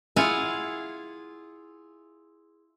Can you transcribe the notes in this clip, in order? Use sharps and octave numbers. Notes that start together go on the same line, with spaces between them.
E4 F4 G#4 F5 F#5 G#5